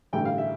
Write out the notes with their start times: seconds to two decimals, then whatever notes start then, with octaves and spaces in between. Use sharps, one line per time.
0.13 A1 G2 D3 A3 G5
0.25 F5
0.38 E5